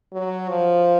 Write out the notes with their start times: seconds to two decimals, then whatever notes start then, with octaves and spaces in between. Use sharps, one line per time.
0.13 F#3
0.49 F3